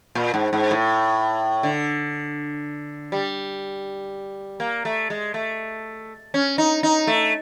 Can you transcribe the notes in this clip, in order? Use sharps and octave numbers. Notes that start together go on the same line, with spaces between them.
A#2
G#2
G#2
A2
D3
G3
A#3
A3
G#3
A3
C#4
D#4
D#4
A3